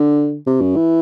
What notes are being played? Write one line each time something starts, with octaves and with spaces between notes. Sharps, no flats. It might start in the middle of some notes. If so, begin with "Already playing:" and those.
Already playing: D3
C3
F#2
E3